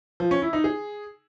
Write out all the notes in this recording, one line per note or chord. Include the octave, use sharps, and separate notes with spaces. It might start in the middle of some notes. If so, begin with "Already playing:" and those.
F3
C#4
E4
D#4
G#4